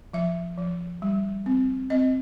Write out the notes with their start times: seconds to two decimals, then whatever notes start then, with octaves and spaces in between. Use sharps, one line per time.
0.13 F3 E5
0.58 F3
1.02 G3
1.46 C4
1.90 C4 D#5